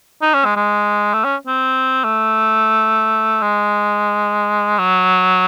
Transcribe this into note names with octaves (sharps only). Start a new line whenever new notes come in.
D#4
C#4
G#3
G#3
A3
C#4
C4
A3
G#3
F#3